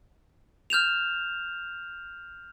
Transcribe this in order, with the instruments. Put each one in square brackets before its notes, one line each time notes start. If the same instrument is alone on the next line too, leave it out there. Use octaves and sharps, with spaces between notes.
[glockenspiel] F6 G6 E7 F7